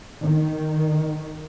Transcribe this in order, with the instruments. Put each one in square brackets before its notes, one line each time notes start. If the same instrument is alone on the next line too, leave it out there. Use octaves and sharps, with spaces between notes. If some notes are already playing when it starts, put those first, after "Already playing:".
[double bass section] D#3